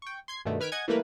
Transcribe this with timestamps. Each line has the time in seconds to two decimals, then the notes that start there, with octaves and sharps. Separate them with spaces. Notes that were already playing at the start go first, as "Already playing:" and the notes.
0.02 G5 C#6
0.28 C6 G#6 C7
0.45 G2 B2 D3 D#3 A3
0.60 D#3 B4 F6 G#6 B6 D7
0.72 D#5 F#5 G#5 G#6
0.88 E3 G3 A3 A#3 A#4 B4